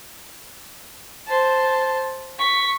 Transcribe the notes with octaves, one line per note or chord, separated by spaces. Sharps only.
C5 A5
C#6 B6